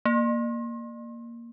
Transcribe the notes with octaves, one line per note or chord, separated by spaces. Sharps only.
A#3